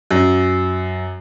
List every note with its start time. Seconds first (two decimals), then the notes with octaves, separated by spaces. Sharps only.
0.11 F#2